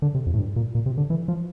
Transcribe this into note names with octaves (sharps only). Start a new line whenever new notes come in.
D3
C3
F2
A2
G2
A#2
A#2
C3
D3
E3
F3